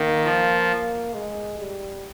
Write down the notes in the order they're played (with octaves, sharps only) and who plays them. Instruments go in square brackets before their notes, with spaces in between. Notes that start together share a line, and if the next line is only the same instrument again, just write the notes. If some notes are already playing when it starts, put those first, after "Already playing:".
Already playing: [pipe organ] D#3 [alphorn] A#3
[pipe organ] F3
[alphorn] G#3
G3